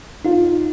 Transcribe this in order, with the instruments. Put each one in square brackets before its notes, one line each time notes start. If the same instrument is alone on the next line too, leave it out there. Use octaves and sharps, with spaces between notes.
[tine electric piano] D#4 [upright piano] F4